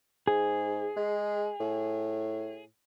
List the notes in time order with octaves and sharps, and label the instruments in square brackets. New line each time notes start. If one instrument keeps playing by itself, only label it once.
[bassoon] G#2 [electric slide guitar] G#4
[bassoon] G#3
A2